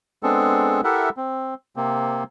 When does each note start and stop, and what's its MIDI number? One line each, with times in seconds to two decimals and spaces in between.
0.23 0.81 56
0.23 0.81 59
0.23 0.81 60
0.23 0.81 62
0.23 0.81 68
0.23 0.81 69
0.84 1.09 64
0.84 1.09 67
0.84 1.09 69
0.84 1.09 70
0.84 1.09 76
0.84 1.09 78
1.17 1.54 60
1.76 2.24 48
1.76 2.24 58
1.76 2.24 60